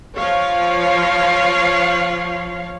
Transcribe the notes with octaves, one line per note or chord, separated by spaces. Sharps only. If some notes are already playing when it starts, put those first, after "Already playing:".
F3 C#5 F5